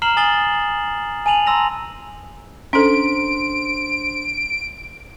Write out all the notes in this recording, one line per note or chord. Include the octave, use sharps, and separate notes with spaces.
A#5 F6 C7 E7 F#7 G7
G#5 D#6 A6 C7 F#7 G7
G#5 A5 D#7 F7 F#7
A5 A#5 C6 E6 A#6 F7
C#4 D4 A4 C5 C6 D7